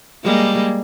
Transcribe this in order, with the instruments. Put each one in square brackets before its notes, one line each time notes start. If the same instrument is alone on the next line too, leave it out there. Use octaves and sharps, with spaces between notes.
[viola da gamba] G3 G#3 A#3